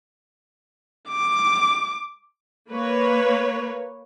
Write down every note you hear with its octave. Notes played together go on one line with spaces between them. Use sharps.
D6
A#3 B4 C#5